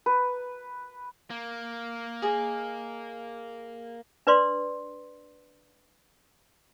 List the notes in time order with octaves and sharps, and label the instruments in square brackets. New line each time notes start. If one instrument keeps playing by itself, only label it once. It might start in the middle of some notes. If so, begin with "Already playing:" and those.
[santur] B4
[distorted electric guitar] A#3
[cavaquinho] G#4 D#5
[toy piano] D4 B4 D5 C6